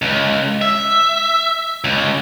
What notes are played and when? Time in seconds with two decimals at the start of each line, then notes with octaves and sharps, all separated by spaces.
0.02 C#2
0.62 E5
1.84 C#2